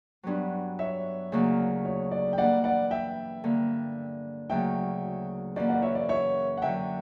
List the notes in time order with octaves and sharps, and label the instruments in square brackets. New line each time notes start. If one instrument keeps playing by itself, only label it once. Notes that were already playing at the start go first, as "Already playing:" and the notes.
[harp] G2 F#3 B3 D4
[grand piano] C#5 E5
[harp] D2 C#3 F#3 A#3
[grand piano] C#5
D5
G5
[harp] G2 E3 A#3 [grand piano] D5 F#5
[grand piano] D5 F#5
E5 G5
[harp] G2 D3 A#3
[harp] D2 C#3 F#3 A#3 [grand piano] E5 G5
[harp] F#2 E3 A#3 [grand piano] D5
[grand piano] D5 F#5
C#5 E5
D5
C#5 E5
F#5
[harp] F#2 D3 F#3 [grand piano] E5 G5